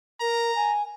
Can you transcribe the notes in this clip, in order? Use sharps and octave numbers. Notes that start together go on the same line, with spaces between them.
A#4 A#5
G#5